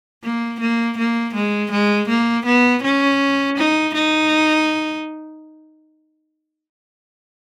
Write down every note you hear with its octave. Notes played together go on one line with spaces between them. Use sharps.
A#3
A#3
A#3
G#3
G#3
A#3
B3
C#4
D#4
D#4